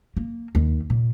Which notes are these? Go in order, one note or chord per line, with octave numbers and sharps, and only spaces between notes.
A#3
D#2
A#2